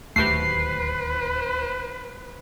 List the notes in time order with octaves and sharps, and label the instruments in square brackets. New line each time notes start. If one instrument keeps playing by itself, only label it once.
[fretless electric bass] D1 D#2 [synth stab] A3 F#4 G4 [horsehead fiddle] B4 C5 [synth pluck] C7